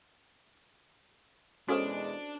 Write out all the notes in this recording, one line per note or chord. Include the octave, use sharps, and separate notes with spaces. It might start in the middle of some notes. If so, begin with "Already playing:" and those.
E2 B2 G#3 C#4 D4 F#4 A4 C5